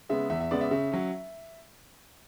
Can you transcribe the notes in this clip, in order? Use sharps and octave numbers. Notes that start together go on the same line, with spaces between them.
C#3 G#3 B3 E5
E2 E5
E5
C#3 G#3 B3 D5
E5
C#3 E5
F#3 C#4